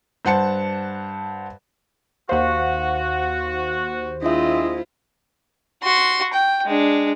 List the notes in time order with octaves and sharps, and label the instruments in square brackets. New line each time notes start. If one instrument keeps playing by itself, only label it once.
[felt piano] G2 C5 F#5 A5 C#7
[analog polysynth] D#2 C5 [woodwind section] F#4 [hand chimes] F5 F#5
[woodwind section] G#3 C4 D#5 [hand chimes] D4 E5 [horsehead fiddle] E4 F4
[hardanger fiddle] F#4 C6
G5
G#3 D4